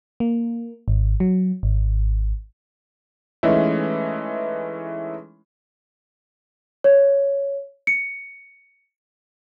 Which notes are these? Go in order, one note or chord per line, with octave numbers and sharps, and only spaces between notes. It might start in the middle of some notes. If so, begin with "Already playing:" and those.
A#3
G#1
F#3
G#1
E3 G#3 A3 C#4 D#4 E4
C#5
C#7